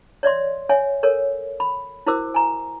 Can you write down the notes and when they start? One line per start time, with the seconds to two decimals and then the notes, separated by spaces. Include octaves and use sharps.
0.23 C#5 D5 E5 C6
0.69 C#5 E5 G#5
1.03 A4 A#4 C#5
1.60 B5
2.06 E4 F#4 A#4 C5 D6 E6
2.34 G#5 A#5